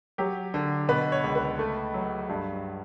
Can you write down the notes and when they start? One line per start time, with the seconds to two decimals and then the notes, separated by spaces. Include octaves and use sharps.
0.18 F#3 G4
0.54 D3
0.88 B2 B4
1.12 C#5
1.24 C#2
1.35 B4
1.59 A3
1.94 F#3
2.29 G2